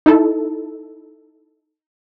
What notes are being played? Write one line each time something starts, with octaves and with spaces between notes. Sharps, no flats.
D#4 E4 A4